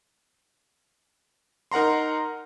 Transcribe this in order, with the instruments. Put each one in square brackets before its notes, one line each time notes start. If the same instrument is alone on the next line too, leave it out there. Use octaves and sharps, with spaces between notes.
[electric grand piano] D#4 A#4 F#5 A#5 C6